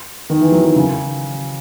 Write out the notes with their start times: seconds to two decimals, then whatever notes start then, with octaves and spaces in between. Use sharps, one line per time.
0.30 D#3
0.41 E3
0.52 F#3
0.64 D#3
0.76 C#3